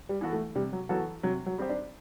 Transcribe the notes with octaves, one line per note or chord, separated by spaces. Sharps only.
G3
E3 B3 F#4 A4
A3
C3 G3
F#3
E3 F#3 B3 F#4 A4
C3 F#3
F#3
G3 C4 G4 C5
D4